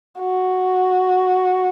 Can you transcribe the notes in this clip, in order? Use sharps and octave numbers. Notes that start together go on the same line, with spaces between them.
F#4